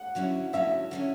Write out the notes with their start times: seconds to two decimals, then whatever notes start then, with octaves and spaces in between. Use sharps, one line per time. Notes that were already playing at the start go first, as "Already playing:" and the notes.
Already playing: F#5
0.15 D3 F#3 C#4 E4
0.53 D3 F#3 C#4 E4 E5
0.91 D3 F#3 C#4 E4